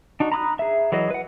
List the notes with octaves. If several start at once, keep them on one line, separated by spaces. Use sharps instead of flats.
D4 D#4 F#4
A#5 B5 D6 D#6 F#6
G#4 E5
E3 F#3 G#4 D#5
B4 F#5